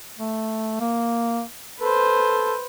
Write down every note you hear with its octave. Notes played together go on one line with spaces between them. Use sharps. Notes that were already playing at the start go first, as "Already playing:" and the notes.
A3
A#3
A4 B4 C5